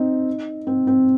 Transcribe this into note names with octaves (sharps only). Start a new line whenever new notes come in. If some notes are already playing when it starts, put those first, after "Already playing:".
Already playing: C4 D#4
C4
C4